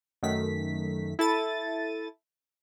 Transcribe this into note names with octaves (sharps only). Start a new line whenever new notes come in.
F#2 D#3 A3 B6
E4 A4 A6 D#7